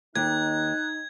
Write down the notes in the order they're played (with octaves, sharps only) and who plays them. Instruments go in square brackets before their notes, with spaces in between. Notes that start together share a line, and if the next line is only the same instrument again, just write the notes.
[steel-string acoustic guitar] D#2 [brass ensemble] D#4 [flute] F#6 [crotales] G#6